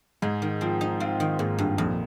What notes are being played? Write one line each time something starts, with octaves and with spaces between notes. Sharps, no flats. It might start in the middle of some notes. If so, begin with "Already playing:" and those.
G#2 G#3
D#3
F3 C4
D#4
C4 F4
D#3
G#2 A#3
G2
A#1 F2